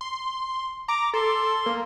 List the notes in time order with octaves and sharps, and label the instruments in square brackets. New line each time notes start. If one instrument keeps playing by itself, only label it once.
[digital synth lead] C6
[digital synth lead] A#5 [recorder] D6
[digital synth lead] A4 [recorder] C6
[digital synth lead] A#3